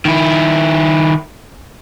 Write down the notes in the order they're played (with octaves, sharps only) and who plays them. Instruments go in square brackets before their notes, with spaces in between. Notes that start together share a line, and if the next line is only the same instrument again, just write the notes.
[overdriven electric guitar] D#3 E4